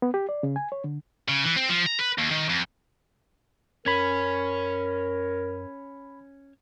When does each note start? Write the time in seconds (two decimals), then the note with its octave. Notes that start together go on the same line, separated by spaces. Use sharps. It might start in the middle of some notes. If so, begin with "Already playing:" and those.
0.02 B3
0.14 G4
0.29 D5
0.43 C#3
0.56 G#5
0.72 C#5
0.84 D3
1.28 C#3
1.44 E3
1.56 C4
1.69 F3
1.86 A#5
1.99 B4
2.18 D#2
2.31 D#3
2.49 F2
3.86 F#2 C#4 A#4 B5 G#6